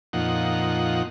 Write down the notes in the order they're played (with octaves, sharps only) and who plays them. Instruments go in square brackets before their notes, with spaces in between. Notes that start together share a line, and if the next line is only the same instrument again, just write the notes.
[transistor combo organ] F2 A#2 D#4 F#5